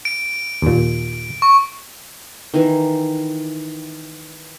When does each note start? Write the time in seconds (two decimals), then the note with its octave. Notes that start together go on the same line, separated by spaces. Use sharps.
0.05 D7
0.62 D#2 A#2
1.42 C#6
2.54 D#3 E3